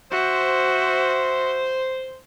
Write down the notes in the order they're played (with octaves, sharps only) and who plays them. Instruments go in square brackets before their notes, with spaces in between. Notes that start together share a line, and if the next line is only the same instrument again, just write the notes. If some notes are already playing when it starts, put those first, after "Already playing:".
[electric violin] F#4 E5 [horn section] C5